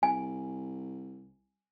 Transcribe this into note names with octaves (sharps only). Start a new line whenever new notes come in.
C2 G#5